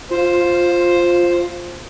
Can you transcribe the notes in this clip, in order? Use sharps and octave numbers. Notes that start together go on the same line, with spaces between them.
F4 C5